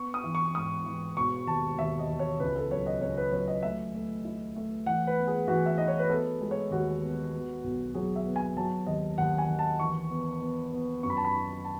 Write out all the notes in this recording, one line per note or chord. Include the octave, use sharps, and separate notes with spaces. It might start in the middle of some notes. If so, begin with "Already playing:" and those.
Already playing: B3 C#6
D#6
E3
C#6
G#2 D#6
E3
E1 C#6
D#2 A5
D#2 E5
D#5
E1
C#5
C#2 B4
A4
F#3 C#5
D#5
C#2 C#5
B4
F#3 C#5
D#5
A3 E5
A3
E4
A3
E3 F#5
B4
B3
G#4
E3 F#4
E5
D#4 D#5
C#5
B4
B3 A4
G#3
C#5
D#2 F#4
B3
B3
B1
F#3 G#4
E5
B3
G#5
F#3 A5
D#2 D#5
D#2 F#5
G#5
D#3
A5
E3 C#6
B3
B3
B3
F#2 C#6
B5
A5
B5
D#4
A5